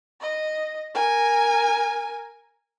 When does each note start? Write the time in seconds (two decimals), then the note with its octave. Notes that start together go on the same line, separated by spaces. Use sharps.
0.21 D#5
0.95 A#4 G#5